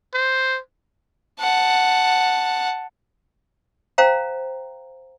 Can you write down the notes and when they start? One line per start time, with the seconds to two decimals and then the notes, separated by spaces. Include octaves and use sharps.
0.14 C5
1.40 F#5 A5
3.98 C5 F5 G5 A#5